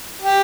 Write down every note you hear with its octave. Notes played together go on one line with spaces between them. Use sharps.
G4